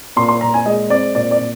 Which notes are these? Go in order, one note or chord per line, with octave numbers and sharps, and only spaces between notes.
A#2 C6
C6
A#2 A#5
G#5
G#3 D#5
C4 D5
A#2 D5
D5
A#2